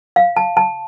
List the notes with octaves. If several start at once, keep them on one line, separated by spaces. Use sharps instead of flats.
F5
A5
A5